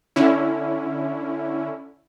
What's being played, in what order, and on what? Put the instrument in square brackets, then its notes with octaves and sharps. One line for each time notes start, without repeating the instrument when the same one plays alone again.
[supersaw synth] D3 C#4 E4